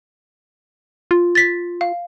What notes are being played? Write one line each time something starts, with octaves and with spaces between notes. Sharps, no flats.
F4
A6 B6
F5